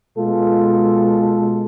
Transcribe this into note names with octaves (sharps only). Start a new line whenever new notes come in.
B2 G#3 F4 A4